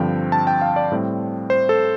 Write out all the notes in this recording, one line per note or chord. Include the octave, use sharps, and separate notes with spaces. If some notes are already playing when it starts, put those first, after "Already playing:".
Already playing: G2 D3 F3 C4 G5
A5
G5
F5
D5
A2 G3 C4
C5
A4